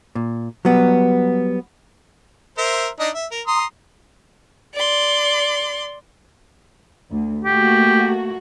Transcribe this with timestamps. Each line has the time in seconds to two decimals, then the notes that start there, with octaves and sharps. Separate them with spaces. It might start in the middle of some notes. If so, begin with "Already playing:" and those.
0.15 A#2
0.65 F#3 G3 B3
2.58 A#4 C5 E5
3.00 D4 D#4 D#5
3.15 E5
3.31 A#4
3.47 A#5 C6 D#6
4.74 D5 C6
7.10 D2
7.45 A3 A#3 F#4 G4